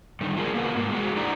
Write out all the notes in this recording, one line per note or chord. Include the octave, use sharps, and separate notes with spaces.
D3 D#3 G3
D4 F4 G#4 A#4 C5
A#3 B3 F#4 A#4
G#2 A#3
G#3 F#4
D4 E4 G4 D5 A#5